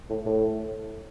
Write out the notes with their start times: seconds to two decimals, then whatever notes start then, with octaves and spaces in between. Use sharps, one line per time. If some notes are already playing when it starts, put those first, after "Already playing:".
0.10 A2
0.26 A2